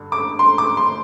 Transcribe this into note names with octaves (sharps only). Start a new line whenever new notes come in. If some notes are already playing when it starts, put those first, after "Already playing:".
Already playing: G2 D3
D6
C6
D6
C6